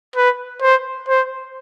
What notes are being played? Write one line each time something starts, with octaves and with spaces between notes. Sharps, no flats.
B4
C5
C5